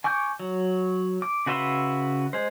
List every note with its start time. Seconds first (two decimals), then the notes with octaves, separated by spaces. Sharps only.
0.04 G#5 C#6 D6 G6
0.40 F#3
1.22 D6
1.46 C#3 F#4 B4 E5 C6
2.33 G#3 C5